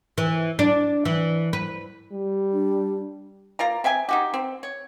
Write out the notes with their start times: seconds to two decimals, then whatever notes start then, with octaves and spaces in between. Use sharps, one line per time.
0.18 E3
0.59 D4
1.05 E3
1.53 B4
2.12 G3
2.53 D4
3.59 A#3 F4 D5 A#5
3.84 C4 E5 G5 G#5
4.09 D#4 F#4 G4
4.34 C4
4.63 C#5